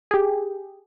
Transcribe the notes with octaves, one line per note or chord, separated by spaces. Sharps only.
G4 G#4